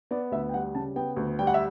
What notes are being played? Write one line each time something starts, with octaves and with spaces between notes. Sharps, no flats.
B3 D5
D2 E5
G5
G3 F#5
C#3 A5
B3 G5
D2
G3 G5
F#5
E5